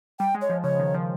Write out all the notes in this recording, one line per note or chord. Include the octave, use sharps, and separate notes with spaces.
G3 G5
G#3
C#5
F3
C#3 C#5
D#3
F3